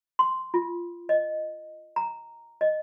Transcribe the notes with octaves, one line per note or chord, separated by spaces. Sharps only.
C6
F4
D#5
A#5
D#5